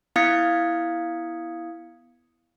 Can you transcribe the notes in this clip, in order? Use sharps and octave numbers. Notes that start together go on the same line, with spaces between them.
B3 E4 F5 D#6 G#6 C#7